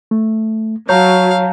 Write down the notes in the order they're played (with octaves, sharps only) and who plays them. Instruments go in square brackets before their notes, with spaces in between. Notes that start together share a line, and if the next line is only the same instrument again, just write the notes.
[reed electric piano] A3
[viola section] F#3 [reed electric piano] C#5 [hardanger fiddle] F5 [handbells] A5 A#5 G6